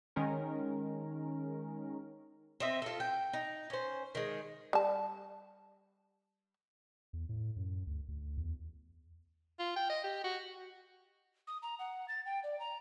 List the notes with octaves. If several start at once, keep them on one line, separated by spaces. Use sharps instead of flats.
D#3 G#3 C#4 A#4
C4 D#5 E5
F4 A4
G5
D#4
C#4 C5
D#3 G#3
G3 A5
E2
A2
F#2
D2
D2
E2
F4
G5
D#5
G4
F#4
D#6
A#5
F#5
A6
G5
D5
A#5